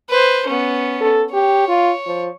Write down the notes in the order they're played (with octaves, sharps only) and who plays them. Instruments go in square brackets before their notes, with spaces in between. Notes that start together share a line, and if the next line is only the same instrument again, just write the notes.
[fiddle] B4 C5
B3 C#4
[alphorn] A4
[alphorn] G4 [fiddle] C#5
[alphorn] F4
F3